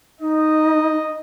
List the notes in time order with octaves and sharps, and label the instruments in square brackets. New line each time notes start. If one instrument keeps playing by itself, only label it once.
[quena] D#4 [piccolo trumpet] D#5